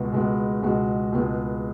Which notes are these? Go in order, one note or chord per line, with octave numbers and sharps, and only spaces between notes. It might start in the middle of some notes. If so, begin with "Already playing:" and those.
Already playing: C#2 B2 G#3 B3 F#4
C#2 B2 G#3 B3 F#4
C#2 B2 G#3 B3 F#4
C#2 B2 G#3 B3 F#4